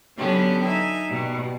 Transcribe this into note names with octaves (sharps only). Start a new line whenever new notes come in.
D3 F#3 B3 C#4 G4
D#4 E5 G#5
B2 G3